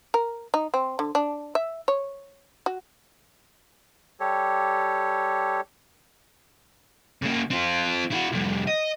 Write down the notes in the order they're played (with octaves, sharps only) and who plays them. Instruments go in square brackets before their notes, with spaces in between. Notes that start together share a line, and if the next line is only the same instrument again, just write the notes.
[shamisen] A#4
D#4
C4
D3
D4
E5
C#5
F#4
[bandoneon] G3 G4 A4 C#5
[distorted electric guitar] C#3 A#3
C4 F4
E4 F#4
C2 F2
D#5